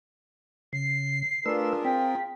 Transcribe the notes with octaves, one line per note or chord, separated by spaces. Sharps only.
C#3 C7
A3 D4 F4 G#4 A#4 B4 E6
C4 G5 B6